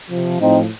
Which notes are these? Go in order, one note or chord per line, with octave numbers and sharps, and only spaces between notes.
C3 F3
A2 F3 C4 D#4